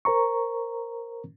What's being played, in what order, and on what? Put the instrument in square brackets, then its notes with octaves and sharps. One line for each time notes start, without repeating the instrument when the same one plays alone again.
[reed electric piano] A#4 C5 A#5 C#6